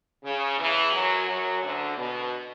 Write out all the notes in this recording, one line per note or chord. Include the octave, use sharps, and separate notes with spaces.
C#3
E2 E3
F#2 F#3
F#2 F#3
D2 D3
B2